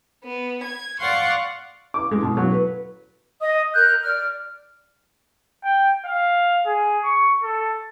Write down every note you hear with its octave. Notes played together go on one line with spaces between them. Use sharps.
B3
G#6
D5 F5 F#5 C6 C#6
D6
G#3
B2
F#3
B4
D#5 D#6
A#4 F#6 G6
D5 F6
G5
F5
G#4
C#6
A4